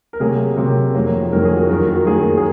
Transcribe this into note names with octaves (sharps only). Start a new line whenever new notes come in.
A#4
C3 F#3 A#3 G#4
C3 F#3 A#3
F2 D#3 F#3 A#3
F2 D#3 F#3 A#3 A#4
G#4
F#4
F#2 D#3 A#3 A#4
F#4
F#4
F#2 D#3 A#3 G#4
G#4